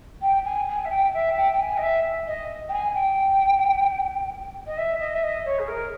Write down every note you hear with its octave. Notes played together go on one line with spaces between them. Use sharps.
G5
G#5
G#5
E5
G5
E5
G5
G5
G#5
D#5
E5
D#5
G5
G#5
G5
D#5
E5
D#5
E5
D#5
C#5
G#4
A#4